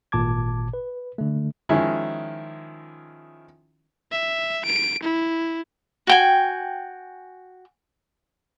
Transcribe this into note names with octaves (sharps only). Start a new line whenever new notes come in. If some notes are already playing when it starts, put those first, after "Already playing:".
G#1 A#2 A5 D6 G#6
B4
D3 A3
D#3 F3 G#3 C#4 E4
E5
D7
E4
F#4 G5 G#5